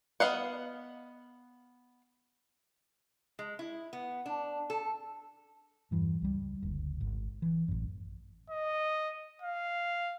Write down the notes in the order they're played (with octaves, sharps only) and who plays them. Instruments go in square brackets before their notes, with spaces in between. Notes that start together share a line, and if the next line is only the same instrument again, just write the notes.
[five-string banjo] B3 D#5 F5 F#5
[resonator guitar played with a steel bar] G#3
E4
B3
D4
A4
[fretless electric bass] E2 G2 E3
C#2 G3
F#1 D2
G#1
E3
A1 F#2
[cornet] D#5
F5